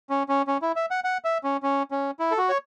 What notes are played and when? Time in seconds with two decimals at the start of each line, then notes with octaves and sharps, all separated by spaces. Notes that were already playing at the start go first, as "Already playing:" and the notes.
0.10 C#4
0.29 C#4
0.47 C#4
0.62 E4
0.76 E5
0.91 F#5
1.04 F#5
1.25 E5
1.44 C#4
1.63 C#4
1.91 C#4
2.19 E4
2.31 A4
2.38 F#4
2.49 C#5